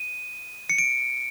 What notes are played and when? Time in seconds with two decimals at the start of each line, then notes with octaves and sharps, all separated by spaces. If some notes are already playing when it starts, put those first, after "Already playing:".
Already playing: D#7
0.70 C#7
0.78 D7